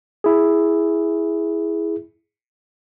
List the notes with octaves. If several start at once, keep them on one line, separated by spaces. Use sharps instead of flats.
E4 G#4